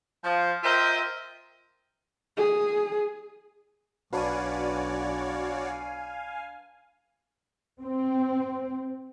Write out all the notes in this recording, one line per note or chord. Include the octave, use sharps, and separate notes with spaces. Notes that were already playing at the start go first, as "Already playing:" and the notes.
F3
F4 A#4 C5 D#5 E5 G5
G#4
B1 D4 F#4 B4 C#5 D5 F5 G#5
C4